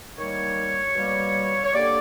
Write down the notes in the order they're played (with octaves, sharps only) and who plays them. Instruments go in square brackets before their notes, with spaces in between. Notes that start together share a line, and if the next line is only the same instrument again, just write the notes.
[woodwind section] D#3 G3 A#3 C#5
B2 G3 A#3
C#5
D3 G3 A#3 D5